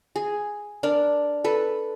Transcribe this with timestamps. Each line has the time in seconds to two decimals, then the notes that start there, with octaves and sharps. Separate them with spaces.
0.16 G#4
0.83 D4 A#4 D5
1.44 A4 B4